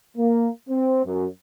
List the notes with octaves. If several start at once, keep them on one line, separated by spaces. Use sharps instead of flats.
A#3
C4
F#2